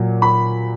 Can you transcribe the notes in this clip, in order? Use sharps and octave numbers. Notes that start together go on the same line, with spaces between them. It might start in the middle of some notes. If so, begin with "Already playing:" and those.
Already playing: A#2 F#3
B5